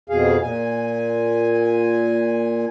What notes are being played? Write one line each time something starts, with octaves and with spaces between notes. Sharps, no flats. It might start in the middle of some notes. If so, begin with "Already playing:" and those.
F2 B2 G#4 F5
A#2 G#5